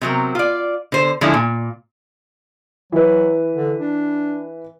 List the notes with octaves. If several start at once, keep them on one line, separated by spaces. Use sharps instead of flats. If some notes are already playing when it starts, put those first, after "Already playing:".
C3 F#3 C4 A#4
F4 D5
D3 C5
D3 F3 G#3 C#4 D4 E4
A#2
E3 F#3 B4
D3
D4